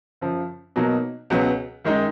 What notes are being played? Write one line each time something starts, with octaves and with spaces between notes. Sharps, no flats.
F#2 C#3 F3
B2 F#3 A#3 D#4
C#2 B2 F#3 B3
F#2 D#3 G#3 D#4